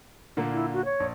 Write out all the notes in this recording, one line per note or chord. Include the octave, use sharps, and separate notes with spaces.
A#2 D3 A#3
E4
F#4
C#5
A#1